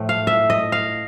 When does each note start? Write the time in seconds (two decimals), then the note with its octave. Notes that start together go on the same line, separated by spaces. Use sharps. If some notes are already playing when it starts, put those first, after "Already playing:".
Already playing: A2 F3 A3
0.09 F5
0.27 E5
0.50 D#5
0.72 F5